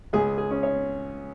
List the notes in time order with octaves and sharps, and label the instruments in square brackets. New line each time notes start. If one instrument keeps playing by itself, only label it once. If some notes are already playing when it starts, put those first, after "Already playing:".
[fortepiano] C#2 G#4
G#4
C#4
C#5